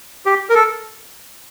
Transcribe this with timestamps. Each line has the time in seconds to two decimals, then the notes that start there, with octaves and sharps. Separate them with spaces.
0.26 G4
0.50 A#4
0.55 A4